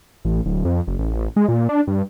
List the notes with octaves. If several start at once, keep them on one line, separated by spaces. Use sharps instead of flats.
A1
D1
F2
F#1
A1
G#3
A#2
D4
G2